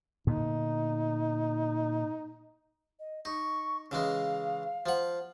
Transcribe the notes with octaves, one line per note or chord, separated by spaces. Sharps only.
A#2 D3 B3 D#4
D#5
D#4 C#6
C#3 E3 G#3 F5
F3 F#5